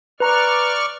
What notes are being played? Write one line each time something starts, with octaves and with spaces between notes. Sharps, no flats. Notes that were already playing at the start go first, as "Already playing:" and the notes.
B4 D5 A#5 C#6 F6